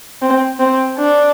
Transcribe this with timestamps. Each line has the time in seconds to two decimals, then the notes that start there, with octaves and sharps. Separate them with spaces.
0.22 C4
0.59 C4
0.98 D4